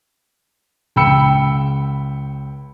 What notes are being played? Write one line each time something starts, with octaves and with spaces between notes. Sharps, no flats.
C#2 G5 B5 E6 C#7